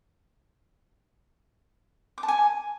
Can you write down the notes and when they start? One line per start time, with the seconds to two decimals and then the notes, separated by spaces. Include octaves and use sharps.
2.18 D6
2.23 A5
2.28 G#5